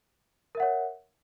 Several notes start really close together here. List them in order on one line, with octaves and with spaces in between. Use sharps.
A#4 E5 F#5 C#5